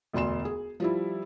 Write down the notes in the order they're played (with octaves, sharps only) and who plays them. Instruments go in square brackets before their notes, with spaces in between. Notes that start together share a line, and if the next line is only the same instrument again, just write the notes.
[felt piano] E1 D2 D5 C6 E7
G#4
F3 G3 E4